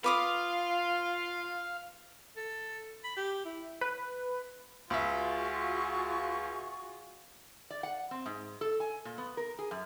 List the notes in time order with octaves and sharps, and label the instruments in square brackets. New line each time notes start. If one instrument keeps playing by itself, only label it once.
[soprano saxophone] F4 [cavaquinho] B4 D6 D#6 [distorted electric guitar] F5
[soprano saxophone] A4
B5
G4
E4
[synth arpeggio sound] B4
[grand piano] C#2 E5 [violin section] F4 F#4 G#4 [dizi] C#6
[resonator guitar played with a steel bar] D5
F#5
C4
G#2
A4
G#5
A#2
B3
A#4
G#4
F#2